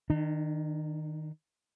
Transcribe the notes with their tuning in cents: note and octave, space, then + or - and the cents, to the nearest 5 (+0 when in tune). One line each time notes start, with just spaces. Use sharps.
D#3 +0 D4 +40